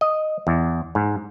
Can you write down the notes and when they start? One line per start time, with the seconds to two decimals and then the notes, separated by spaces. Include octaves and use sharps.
0.01 D#5
0.47 E2
0.95 G#2